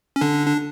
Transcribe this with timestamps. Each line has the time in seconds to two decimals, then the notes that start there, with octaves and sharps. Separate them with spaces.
0.16 C#4
0.21 D3 D4
0.47 D4